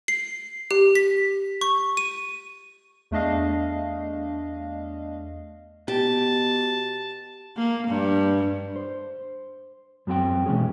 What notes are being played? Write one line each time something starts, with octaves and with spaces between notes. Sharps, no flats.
C7
G4
B6
C#6
D#7
E2 A3 D4 D#5 F5
B2 G4 A5
A#3
G2
C5
F#2 F#3 C4 G4 G5
B2 E3 G#3 C#4 G#4